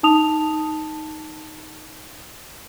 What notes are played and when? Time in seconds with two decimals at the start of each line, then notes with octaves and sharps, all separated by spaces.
0.03 D#4 A5 D#6 F7